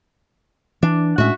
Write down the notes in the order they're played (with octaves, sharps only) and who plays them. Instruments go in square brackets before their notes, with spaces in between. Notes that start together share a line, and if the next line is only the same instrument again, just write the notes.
[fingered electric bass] E3 [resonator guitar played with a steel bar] D4
[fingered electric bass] A2 G#3 C#4 [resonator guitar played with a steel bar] F#4 E5